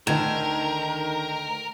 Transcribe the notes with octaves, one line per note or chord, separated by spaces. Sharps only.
D2 D#3 A#4 G#6 E7